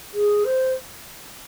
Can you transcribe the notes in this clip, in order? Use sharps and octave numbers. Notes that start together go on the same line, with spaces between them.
G#4
C5